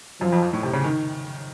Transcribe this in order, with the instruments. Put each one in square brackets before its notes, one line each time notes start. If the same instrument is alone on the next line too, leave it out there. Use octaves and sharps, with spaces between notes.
[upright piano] F#2 [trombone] F3
[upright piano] F2
F2
A2
C3
C#3
D#3